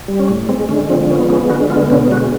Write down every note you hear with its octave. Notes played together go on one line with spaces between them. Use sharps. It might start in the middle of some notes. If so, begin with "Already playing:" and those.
G3
C#4
A2
G#3 C4
D3 C#4
F3 C4
B3 C#4
G#3 C#4
D3 F#4
B3 F4
B2 C#4
G#3 F#4